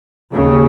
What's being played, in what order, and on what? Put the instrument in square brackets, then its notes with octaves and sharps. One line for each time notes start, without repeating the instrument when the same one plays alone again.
[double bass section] D#2 C#3